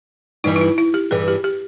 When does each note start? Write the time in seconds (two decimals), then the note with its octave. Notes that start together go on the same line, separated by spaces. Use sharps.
0.44 G2 E3 G3 D#4
0.56 D#4
0.61 E4
0.78 E4
0.94 G4
1.11 G2 E3 G3 G#4
1.28 G4
1.44 G4